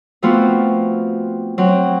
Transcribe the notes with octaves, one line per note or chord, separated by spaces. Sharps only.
F3 A3 B3 C4 F4 F#4
F#3 C4